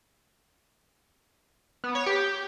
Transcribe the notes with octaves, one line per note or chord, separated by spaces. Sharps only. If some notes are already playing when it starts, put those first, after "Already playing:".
B3
C#5
G4